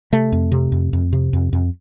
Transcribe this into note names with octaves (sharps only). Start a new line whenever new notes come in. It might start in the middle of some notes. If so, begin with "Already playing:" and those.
C3 A3
F2
C3
F2
F2
C3
F2
F2